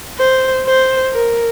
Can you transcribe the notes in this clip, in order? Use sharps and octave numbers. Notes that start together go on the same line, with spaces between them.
C5
C5
A#4